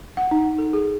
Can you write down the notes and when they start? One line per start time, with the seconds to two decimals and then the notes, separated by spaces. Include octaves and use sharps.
0.17 F#5
0.31 D#4
0.58 A4
0.73 G#4